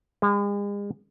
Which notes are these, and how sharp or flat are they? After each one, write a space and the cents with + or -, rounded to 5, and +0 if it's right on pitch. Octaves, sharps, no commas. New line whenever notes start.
G#3 -40